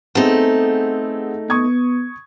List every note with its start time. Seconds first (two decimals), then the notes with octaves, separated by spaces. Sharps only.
0.15 A3 B3 C4 D#4 G#4
1.50 B3 C#6 D#6 G#6